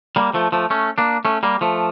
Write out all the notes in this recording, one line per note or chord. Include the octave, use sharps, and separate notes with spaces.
G3 A#3
F3 A3
F3 A3
A3 C#4
A#3 D4
A3 C#4
G3 A#3
F3 A3